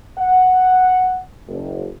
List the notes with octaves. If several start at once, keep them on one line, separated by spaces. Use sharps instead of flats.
F#5
F#1